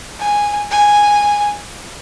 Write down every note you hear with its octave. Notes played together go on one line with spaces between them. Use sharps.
G#5
G#5